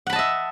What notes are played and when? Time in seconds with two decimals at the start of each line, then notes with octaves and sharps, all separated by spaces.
0.07 F#5
0.10 B5
0.13 A5
0.16 D#5
0.19 E5